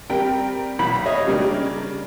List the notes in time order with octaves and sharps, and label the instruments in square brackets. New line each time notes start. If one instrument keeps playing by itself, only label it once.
[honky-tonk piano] G3 C4 A#4 [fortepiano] G5
[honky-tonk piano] B1 [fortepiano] B5
[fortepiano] C#5 D#5
[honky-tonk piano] C#3 A#3 D4 [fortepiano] G3